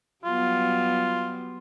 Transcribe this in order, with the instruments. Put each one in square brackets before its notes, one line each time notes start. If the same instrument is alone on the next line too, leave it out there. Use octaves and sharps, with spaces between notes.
[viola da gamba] F#3 G3 B3 [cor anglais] F4